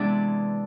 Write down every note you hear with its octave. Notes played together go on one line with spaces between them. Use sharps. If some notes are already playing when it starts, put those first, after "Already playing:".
Already playing: C3 E3 G#3 B3 D4 E4 D5